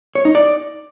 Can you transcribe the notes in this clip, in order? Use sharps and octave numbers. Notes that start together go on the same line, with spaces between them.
C#5
D#4
D5